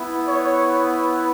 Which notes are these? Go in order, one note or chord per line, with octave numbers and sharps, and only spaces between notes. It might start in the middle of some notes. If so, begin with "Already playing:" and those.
Already playing: B3 E4
C#5